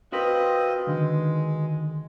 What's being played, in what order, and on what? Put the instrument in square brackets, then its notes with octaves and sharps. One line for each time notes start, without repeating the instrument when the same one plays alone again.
[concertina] C4 F4 D#5 [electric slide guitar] F#4 A#4 B4
[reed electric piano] D3 D#3 [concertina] G#3